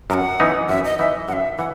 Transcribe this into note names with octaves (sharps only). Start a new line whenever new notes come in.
F#2 F#5 A#5
E3 B3 D#4
F#2 E5
D#5
E3 B3 D#4 E5
F#2 E5 F#5
E3 F#5